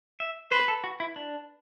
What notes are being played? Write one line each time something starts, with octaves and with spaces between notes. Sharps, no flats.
E5
B4 C5
A4
F#4
E4
D4